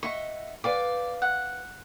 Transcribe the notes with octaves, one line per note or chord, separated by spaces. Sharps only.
D#5 E5 F#5 C#6
B4 D5 F5 G5
F#5